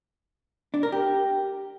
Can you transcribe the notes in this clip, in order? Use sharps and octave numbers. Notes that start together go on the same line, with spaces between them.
D4
A#4
G4